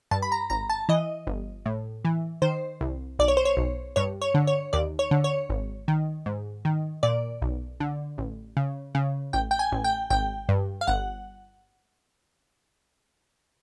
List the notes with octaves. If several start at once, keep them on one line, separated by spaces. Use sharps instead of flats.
G2 A5
B5
A#5
G#1 A#5
A5
E3 D#5
G1
A2
E3
D#3 C5
C2
B1 D5
C#5
C5
C#5
B1
G2 C#5
C#5
D3
C#5
D#2 D5
C#5
D3
C#5
G#1
D#3
G#2
D#3
A#2 D5
B1
D3
A1
C#3
C#3
A1 G5
G5
G#5
A1
G5
G#1 G5
G2
F5
G1 F#5